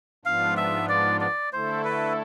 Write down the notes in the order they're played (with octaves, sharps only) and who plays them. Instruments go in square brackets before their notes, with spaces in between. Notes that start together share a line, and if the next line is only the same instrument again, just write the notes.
[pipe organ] G#2 F3 B3 D4 F4 [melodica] F5
[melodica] E5
D5
D5
[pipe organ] D3 A3 E4 A4 [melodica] C5
[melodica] B4